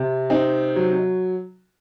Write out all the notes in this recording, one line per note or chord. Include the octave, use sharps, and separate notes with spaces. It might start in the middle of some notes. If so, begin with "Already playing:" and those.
Already playing: C3
C4 D#4
F#3